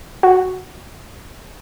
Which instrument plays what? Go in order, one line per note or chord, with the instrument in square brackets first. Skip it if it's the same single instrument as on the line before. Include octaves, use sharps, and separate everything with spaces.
[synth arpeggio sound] F#4